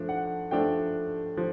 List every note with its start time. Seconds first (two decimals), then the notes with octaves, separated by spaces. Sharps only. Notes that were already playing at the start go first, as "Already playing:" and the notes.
Already playing: F3 A3 D4
0.09 F#5
0.51 F3 A3 D4 G5
1.37 F3